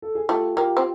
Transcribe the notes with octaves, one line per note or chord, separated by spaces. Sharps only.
A4
G#4
A3 F4 G4
A#3 F4 G4
C4